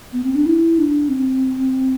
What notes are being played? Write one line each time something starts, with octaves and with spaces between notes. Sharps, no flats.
B3
C4
D4
E4
D4
C4